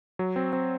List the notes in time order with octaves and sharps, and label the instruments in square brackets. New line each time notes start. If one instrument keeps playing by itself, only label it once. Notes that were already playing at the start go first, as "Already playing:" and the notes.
[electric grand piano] F#3
C4
C4